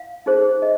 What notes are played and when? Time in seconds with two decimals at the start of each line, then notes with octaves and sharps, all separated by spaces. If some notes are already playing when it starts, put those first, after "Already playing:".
Already playing: F5
0.26 D#4 G#4 C5
0.62 D#5